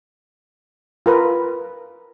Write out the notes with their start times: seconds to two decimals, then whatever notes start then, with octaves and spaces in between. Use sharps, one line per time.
1.06 F4 A#4 B4